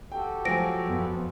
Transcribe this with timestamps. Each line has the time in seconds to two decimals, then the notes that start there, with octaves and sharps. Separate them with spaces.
0.12 F#4 G4 A4 G5
0.45 F3 F#3 G#5 A#6 D7
0.85 F2 B3